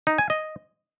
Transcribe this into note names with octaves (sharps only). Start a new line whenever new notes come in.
D#4
G#5
D#5